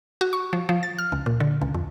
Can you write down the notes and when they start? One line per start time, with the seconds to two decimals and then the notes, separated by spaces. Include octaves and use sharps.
0.21 F#4
0.33 C#6
0.53 F3
0.69 F3
0.83 A6
0.98 F6
1.12 C#2
1.26 A#2
1.40 D3
1.61 C#2
1.74 F2